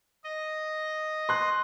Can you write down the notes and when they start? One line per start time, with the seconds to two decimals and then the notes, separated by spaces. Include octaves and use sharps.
0.24 D#5
1.29 C6 F#6